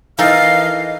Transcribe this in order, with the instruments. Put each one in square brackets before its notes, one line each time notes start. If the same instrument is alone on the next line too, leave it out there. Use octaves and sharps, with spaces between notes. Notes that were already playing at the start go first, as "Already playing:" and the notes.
[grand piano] E3 [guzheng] D#4 A4 A#4 [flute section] D#5 F6 [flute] F5